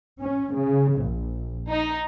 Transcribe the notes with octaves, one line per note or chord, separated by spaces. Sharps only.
C#4
C#3
A#1
D#4